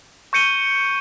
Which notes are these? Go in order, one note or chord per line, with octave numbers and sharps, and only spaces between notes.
C#6 G6 C#7 D#7 G7